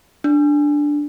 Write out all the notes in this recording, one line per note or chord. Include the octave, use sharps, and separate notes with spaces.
D4